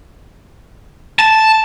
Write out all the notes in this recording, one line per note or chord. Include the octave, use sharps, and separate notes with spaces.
A5